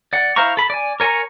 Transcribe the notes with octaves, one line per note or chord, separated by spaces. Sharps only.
D5 F#5
E4 C5 F5 A#5 C#6
A4 B5
D5 G#5
A#4 C#5 G#5 A#5 C#6